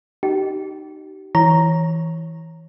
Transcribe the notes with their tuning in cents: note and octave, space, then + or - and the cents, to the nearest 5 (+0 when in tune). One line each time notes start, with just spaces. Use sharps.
D#4 -15 G4 -35
E3 -15 C#5 -10 A#5 +0